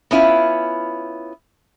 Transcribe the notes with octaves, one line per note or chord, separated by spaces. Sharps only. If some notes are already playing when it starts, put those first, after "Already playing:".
B3 C#4 E4 F4